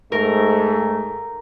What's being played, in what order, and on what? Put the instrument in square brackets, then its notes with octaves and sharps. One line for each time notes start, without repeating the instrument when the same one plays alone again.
[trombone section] G#2 A3 [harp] A#4